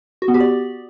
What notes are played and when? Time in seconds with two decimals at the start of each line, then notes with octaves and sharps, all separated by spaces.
0.22 F#4
0.28 B3
0.34 G4
0.40 D5